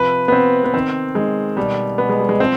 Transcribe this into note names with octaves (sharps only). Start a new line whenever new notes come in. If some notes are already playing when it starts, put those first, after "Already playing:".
Already playing: C3 F3 B4
B3
C3 C4
B3
D#3 C4
D#3 G#3
B2 G3
B2 B3
G#3
G3
G#3
F3 C4